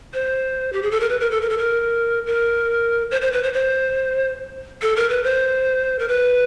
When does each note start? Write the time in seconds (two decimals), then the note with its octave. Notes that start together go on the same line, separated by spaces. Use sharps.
0.14 C5
0.73 G4
0.82 G#4
0.91 A4
1.01 A#4
1.09 B4
1.20 A#4
1.31 A4
1.42 A#4
1.50 A4
1.58 A#4
2.26 A#4
3.11 C5
3.22 C5
3.33 B4
3.43 C5
3.54 C5
4.82 A4
4.96 A#4
5.09 B4
5.24 C5
5.99 A#4
6.08 B4